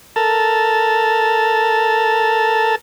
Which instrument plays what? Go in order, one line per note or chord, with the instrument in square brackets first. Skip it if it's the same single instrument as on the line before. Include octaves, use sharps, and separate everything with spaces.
[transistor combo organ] A4 A#4 A5